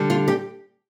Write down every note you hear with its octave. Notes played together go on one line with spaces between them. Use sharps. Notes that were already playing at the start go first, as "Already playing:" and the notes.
Already playing: D3 G3
F4
G4